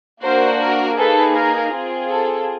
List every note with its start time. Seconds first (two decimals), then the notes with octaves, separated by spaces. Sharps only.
0.23 A#3 D4 F#4 A#4 C5
0.60 A#4
0.98 A#3 D#4 G#4 A4 B4
1.36 A#4
1.72 C4 F4 G#4
2.10 A4